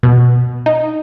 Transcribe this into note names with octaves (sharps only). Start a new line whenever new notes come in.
B2
D#4